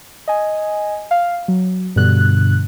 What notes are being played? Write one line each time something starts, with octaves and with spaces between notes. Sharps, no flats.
D#5 G#5
F5
F#3
G2 B2 D3 F#6